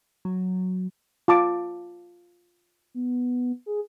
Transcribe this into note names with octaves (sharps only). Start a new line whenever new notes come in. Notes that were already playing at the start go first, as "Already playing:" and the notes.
F#3
F4 A5 D6
B3
G#4